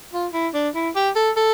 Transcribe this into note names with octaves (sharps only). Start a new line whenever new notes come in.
F4
E4
D4
E4
G4
A4
A4